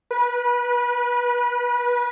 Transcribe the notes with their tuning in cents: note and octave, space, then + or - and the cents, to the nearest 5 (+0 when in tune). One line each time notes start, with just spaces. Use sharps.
B4 -25